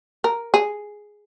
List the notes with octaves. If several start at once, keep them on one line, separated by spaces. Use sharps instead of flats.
A#4
G#4